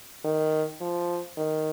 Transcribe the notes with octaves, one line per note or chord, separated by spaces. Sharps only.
D#3
F3
D#3